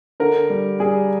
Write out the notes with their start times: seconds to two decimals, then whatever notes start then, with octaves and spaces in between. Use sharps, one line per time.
0.20 D3 A#4
0.50 G3
0.80 G3 G#4